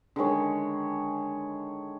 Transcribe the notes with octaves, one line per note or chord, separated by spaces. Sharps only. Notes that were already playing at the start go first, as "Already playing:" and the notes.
D3 D#3 G#3 C#5